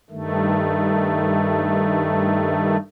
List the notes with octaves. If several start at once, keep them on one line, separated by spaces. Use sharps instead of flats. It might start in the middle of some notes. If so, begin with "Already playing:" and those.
G2 D#3 A3